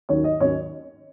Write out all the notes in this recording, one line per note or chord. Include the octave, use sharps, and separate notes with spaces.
D#2 D#3 F#3 C#4 C#5
D#5
D#2 D#3 F#3 C#4 C#5